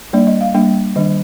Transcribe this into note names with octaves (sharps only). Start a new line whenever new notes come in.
G3 A#3 D4 D5
D#5
F5
G3 A#3 D4 G5
D#3 G3 D4 D#5